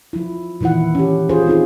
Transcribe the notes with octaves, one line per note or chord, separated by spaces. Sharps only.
F3 E4
A#2 D#3 E3 E4 F#5
C#4 G4
C#4 F4 G#4 C5
C4 D#4 F4 G#4